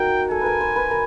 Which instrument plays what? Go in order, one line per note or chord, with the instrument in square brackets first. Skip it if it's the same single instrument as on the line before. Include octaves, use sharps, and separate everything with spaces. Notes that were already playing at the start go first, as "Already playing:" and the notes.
Already playing: [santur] D#4 F#4 A#4 [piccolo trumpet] G5
[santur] A4 [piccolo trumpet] G#5
[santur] A#4 B4
C5
B4
A#4